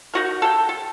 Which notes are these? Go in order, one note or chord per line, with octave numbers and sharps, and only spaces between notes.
D#4 F#4 A#4
A4 G5
A4